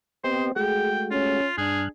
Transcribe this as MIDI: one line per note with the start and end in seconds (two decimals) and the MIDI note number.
0.24 0.52 59
0.24 0.55 60
0.24 0.52 67
0.24 0.47 72
0.24 0.52 75
0.56 1.41 56
0.56 1.41 57
0.56 1.41 66
0.56 0.90 68
0.56 1.04 79
1.11 1.48 61
1.11 1.55 65
1.58 1.89 43
1.58 1.86 62
1.58 1.83 68
1.58 1.89 89
1.58 1.89 90